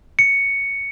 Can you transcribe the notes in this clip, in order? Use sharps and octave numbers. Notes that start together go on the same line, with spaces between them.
C#7